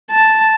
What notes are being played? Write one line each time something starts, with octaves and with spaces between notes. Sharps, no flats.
A5